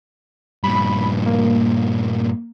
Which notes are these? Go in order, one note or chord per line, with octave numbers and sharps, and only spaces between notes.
G2 A#2 B5
A#3